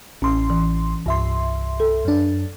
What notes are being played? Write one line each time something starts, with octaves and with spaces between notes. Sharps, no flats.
A1 C#4 C6
E3
C2 G2 E5 C6
A4
F#2 D4